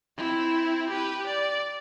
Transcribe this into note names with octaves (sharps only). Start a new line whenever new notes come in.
C4 E4
G4 B4
D5